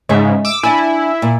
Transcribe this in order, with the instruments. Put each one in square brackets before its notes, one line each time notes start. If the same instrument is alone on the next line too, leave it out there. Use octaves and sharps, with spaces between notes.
[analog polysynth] G#2 C#3 [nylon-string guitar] G#3 E5
[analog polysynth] D6 E6
[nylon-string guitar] D4 D5 G#5 [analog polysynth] E4
[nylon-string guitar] A#2